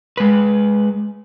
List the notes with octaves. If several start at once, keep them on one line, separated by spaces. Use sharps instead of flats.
G#3 B4